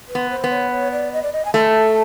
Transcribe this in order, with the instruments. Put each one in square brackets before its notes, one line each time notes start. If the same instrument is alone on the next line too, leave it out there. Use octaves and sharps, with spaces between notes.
[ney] B4
[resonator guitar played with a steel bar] B3
[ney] C5
[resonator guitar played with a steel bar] B3
[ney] C#5
C#5
D5
D#5
D5
D#5
G#5
[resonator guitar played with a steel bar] A3 [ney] A5